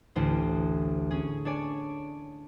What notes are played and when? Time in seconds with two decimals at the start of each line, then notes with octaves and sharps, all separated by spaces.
0.15 A1 D2 C5
1.11 C#4 G#4
1.45 D4 C#5 D5 G#5